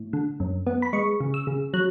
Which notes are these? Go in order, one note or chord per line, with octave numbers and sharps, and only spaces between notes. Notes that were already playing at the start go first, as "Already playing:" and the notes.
Already playing: A2
D3
F#2
B3
B5
G#3 C#6
C#3
E6
C#3
F#3 F#6